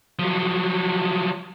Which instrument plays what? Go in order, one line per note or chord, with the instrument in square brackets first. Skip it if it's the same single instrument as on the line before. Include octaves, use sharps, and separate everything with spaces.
[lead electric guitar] F3 F#3